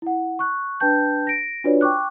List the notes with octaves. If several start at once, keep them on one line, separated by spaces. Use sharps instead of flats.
E4 F#5
C#6 F#6
D4 B4 G5 A5 G6
A#6 D7
D4 F4 F#4 B4 C#5 D5
G5 C#6 D6 F#6